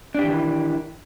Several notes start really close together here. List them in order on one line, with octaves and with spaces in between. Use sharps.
D4 G4 E3 D#3 E4